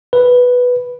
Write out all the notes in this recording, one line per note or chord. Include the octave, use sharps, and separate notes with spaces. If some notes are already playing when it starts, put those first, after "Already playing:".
B4